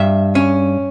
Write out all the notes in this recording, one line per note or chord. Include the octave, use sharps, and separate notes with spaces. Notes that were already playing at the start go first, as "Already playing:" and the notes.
Already playing: G2 E5
C#4